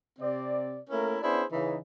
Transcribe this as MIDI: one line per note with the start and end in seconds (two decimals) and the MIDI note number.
0.19 0.77 48
0.19 0.77 60
0.19 0.77 74
0.90 1.17 57
0.90 1.17 58
0.90 1.17 61
0.90 1.17 64
0.90 1.17 70
1.22 1.43 59
1.22 1.43 61
1.22 1.43 62
1.22 1.43 64
1.22 1.43 68
1.22 1.43 72
1.51 1.76 49
1.51 1.76 52
1.51 1.76 63